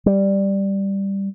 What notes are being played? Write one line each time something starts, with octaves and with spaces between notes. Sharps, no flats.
G3